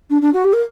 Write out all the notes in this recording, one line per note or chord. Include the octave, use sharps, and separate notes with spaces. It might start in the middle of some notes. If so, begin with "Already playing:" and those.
D4
D4
F#4
G4
A#4